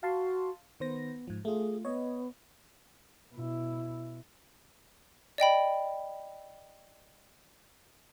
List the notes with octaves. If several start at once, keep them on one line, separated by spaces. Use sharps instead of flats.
F#4 F5 A5 C6
D#3 B3 C5 A#6
G#2 F3
A3 F4 G#4
B3 C#5 D#5
B2 E4
D5 D#5 G5 B5